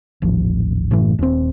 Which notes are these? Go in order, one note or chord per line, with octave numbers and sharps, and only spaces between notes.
D#1 A1 F3
F#1 A2 E3 A3
D#1 C4